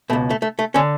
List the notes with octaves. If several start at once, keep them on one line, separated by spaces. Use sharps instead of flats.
C#2 B2 A3
A3
A3
A3
D3 C#4